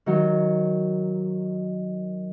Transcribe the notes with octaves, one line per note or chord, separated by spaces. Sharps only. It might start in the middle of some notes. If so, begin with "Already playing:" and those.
D#3 F#3